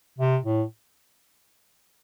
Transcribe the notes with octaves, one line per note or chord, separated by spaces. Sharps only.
C3
A2